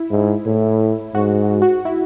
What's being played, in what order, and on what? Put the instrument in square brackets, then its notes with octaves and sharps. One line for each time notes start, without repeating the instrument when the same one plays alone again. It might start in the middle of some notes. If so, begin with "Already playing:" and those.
Already playing: [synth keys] E4
[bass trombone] G#2
A2
[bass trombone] G#2 [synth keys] F#4
[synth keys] F#4
E4